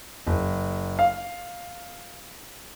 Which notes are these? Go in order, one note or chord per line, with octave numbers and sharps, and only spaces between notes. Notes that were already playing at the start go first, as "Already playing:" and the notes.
F#1
F5